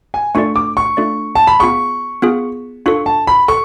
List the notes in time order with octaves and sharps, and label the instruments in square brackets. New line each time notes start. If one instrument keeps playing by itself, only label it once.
[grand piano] G#5
[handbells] A3 D4 F4 A4 D5 [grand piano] C#6
[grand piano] D6
C#6
[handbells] A3 D4 F4 A4 D5
[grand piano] A5
B5
[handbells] B3 F4 G#4 [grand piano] C#6
[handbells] B3 F4 G#4
[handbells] D4 F4 A4 [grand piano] C#6
[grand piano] A5
B5
[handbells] A4 [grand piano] C#6